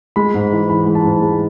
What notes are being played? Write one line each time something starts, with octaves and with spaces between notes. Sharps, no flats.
G#3 B5
G#2
E3
E3 B5
G#3
A5
G#2
G#3